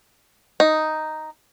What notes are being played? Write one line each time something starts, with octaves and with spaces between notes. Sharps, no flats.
D#4